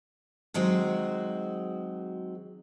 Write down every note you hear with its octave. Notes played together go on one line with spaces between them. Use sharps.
D#3 F#3 G#3 C4 F#4